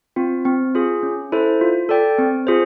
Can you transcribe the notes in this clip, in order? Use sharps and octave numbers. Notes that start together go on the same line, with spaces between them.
C4 F4
C4
F4 G#4
C#4
E4 A4 C5
F4
A4 D5 G5
C4
F4 G#4 C5